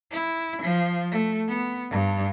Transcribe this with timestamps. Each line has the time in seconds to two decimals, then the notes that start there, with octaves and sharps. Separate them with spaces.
0.12 E4
0.62 F3
1.11 A3
1.49 B3
1.91 G2